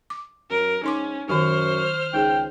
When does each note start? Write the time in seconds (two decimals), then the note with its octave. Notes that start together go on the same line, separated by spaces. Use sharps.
0.10 D6
0.50 F#2 A#4
0.84 G#2 C#4 D#4 C6 D6
1.29 F#2 D#3 G4 C5 C#6 F6
2.14 C#2 D#4 G#4 G5